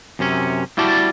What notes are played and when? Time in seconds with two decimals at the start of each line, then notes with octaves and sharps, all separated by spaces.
0.19 F#2 C3 C#4
0.77 G3 E4 F#4 D5 A5